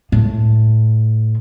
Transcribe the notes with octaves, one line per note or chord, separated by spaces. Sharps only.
A2